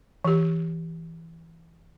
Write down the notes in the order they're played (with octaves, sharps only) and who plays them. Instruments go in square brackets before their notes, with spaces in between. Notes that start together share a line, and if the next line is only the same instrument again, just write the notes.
[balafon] E3 G4